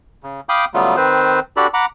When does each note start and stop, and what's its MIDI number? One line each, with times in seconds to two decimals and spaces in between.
0.23 0.41 49
0.49 0.65 77
0.49 0.65 79
0.49 0.65 83
0.49 0.65 86
0.49 0.65 87
0.49 0.65 91
0.74 0.96 49
0.74 0.96 54
0.74 0.96 55
0.74 0.96 57
0.74 0.96 59
0.74 0.96 65
0.97 1.40 51
0.97 1.40 60
0.97 1.40 71
0.97 1.40 72
1.57 1.67 62
1.57 1.67 66
1.57 1.67 67
1.57 1.67 69
1.57 1.67 74
1.57 1.67 83
1.74 1.86 78
1.74 1.86 82
1.74 1.86 83
1.74 1.86 86